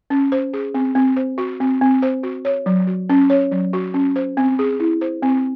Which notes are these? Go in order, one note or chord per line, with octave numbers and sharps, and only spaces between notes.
C#4
C5
G#4
C4
C4
C5
F#4
C4
C4
C5
F#4
C#5
F#3
F#4
C#4
C#5
F#3
F#4
C#4
C5
C4
G#4
E4
C5
C4